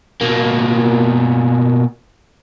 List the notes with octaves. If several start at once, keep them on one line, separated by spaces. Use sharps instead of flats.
B2 A#3